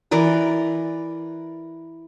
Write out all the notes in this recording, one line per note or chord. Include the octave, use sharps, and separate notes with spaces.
E3 A#4 D5 A#5